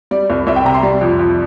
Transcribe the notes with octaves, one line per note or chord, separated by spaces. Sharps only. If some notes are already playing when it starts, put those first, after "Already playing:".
G3 D5
C2
C2 E5
G5
C3 A#5
C6
G3
F2
F2